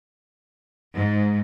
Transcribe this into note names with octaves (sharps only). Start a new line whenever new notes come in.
G#2